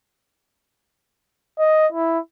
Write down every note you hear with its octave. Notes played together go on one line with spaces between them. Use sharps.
D#5
E4